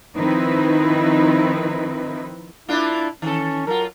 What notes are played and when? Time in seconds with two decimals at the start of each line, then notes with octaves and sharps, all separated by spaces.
0.17 D#3 F3 C4 D#4 E4 B4
2.69 A#3 D4 E4 F4
3.22 D#3 C#4 A4
3.67 F#3 F4 A#4